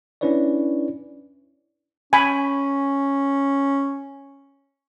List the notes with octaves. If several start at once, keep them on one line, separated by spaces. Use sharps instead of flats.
C#4 D4 E4 B4 C#5 D5
C#4 G#5 B5